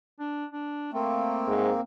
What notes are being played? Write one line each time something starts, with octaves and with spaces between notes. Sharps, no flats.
D4
D4
A3 A#3 C4
G#2